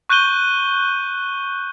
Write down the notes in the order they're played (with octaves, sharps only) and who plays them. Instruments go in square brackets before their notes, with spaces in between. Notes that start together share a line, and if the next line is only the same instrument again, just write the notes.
[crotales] C#6 F#6 G6 D#7 G7